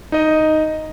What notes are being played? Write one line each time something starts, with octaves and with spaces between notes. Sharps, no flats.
D#4 D#5